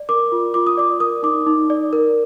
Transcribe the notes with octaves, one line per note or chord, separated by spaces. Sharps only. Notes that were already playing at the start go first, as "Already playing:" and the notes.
Already playing: D5
A#4 D6
F4
F4 D6
D#6
D5 D6
A#4 D#6
D#4 D6
D#4
D5
A#4